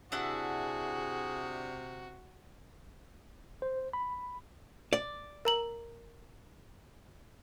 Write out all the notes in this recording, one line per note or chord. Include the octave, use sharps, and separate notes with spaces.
C3 D4 E4 F#4 G#4 F#5
C5
B5
D5
A#4 A#5 F#7